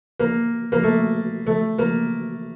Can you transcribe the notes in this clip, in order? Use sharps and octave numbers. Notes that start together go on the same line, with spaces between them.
A#3
A#3
A3
A3
A#3